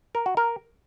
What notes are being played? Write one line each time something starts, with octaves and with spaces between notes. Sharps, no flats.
A#4
F#4
A#4